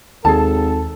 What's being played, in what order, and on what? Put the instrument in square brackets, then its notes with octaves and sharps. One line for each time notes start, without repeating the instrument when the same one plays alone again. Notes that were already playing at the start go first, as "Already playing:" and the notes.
[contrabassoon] G#1 [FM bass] D#2 [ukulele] G#4 A5 [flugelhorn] A4